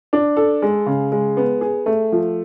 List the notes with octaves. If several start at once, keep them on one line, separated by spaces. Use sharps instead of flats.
D4
A4
G#3
C#3
G#3
B3
G#4
A3
F3